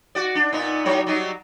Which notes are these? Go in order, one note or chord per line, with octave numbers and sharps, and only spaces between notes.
F#4 D5
D4
A#2 B3 D#4
A2 F#3 C#5
F#3 G3 D#4